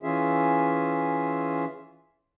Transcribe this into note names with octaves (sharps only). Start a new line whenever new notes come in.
E3 C#4 F4 G#4 E5